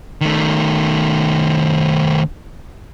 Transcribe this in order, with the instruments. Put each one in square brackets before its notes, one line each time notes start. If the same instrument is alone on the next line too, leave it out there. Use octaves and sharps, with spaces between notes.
[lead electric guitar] D#3 A3